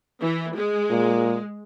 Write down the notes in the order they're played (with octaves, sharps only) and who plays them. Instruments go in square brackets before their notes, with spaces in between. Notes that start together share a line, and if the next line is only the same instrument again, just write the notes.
[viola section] E3
G#3
[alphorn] A#2